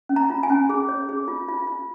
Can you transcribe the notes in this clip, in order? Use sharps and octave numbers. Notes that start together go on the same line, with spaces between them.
C#4
A#5
F4
G#5
C#4
G#4
C#5
G#4
F4
F4
F4